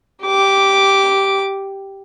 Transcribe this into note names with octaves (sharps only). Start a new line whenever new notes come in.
G4 D6